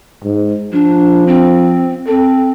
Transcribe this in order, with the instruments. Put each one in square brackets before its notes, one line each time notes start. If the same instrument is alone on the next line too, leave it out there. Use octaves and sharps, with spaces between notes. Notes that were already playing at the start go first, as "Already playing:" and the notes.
[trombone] G#2
[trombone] F3 [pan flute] D4
[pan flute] C4
[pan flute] C4 [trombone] A4